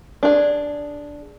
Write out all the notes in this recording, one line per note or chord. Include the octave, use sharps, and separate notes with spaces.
D4 G#4